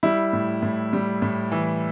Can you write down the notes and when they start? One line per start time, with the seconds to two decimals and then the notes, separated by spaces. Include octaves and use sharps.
0.03 G3 E4
0.33 A2
0.62 A2
0.93 G3
1.22 A2
1.52 E3